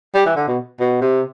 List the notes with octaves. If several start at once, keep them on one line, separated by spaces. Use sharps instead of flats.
G3
E3
D3
B2
B2
C3